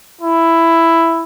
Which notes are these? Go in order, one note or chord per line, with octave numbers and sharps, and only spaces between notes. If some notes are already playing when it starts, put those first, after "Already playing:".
E4